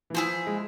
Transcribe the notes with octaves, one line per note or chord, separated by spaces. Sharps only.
E3
F3 E4 G#4 C5
G#3